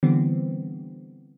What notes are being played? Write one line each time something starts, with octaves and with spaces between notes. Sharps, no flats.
D3 E3 G3 B3 C4